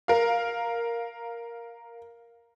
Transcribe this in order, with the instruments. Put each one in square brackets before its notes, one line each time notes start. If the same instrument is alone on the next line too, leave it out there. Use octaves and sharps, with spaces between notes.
[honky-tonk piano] A#4 F5